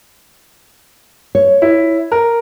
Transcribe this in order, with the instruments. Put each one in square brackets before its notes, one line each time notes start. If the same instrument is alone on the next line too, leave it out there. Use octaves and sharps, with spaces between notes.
[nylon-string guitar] C#5
[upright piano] E4
A#4